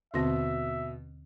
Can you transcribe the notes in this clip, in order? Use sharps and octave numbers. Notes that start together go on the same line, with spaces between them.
D#2 B2 D3 C4 E5 C6 A#6